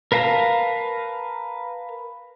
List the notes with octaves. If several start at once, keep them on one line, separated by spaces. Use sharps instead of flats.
A#4 B4 F5 A5 A#5